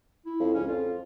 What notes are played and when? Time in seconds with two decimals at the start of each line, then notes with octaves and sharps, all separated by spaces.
0.26 E4
0.40 F2
0.54 C#2 C#4
0.67 F2 F4